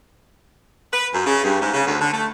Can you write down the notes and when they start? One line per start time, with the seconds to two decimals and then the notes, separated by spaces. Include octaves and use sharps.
0.93 B4
1.14 F#2
1.26 C#3
1.44 G2
1.61 G#2
1.74 C#3
1.87 D2
2.00 D3
2.13 A3